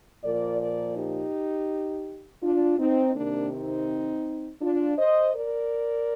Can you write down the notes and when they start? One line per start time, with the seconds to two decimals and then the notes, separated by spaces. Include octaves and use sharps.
0.24 A#2 F3 A#4 D5
0.61 A#4 D5
0.97 D#4 G4
2.43 D4 F4
2.79 C4 D#4
3.15 C3 D#3 A#3 D4
3.52 C4 D#4
4.61 D4 F4
4.97 C5 D#5
5.34 A#4 D5